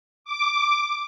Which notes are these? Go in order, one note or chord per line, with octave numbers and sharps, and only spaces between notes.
D6